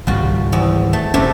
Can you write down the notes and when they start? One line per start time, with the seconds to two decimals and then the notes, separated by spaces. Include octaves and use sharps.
0.07 G#1 C#2 G3 F4 F#4
0.52 E2 C4
0.93 A3
1.14 F1 C3 A3 C#4